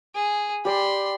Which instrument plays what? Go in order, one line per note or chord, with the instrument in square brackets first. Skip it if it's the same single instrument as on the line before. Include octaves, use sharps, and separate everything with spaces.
[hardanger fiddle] G#4
[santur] G4 D5 [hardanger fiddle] B5 C6